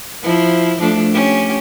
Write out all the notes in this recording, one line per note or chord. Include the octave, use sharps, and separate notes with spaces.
F3 E4
F3 A3 D4
C#4 G4